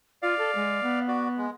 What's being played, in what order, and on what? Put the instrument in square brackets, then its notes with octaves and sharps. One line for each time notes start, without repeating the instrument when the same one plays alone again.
[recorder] F4 [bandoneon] D5 F5
[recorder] A4
G#3
B3
[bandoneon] F#4 D5
G#3